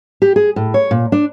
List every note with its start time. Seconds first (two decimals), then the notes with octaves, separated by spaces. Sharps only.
0.22 G4
0.36 G#4
0.56 A2
0.74 C#5
0.91 A#2
1.12 D4